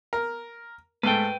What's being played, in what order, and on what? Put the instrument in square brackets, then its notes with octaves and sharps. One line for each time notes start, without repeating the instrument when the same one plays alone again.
[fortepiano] A#4
[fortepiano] G#2 A3 [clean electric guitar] B4 G5